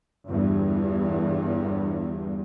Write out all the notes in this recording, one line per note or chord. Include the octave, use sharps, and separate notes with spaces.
G1 E2 G2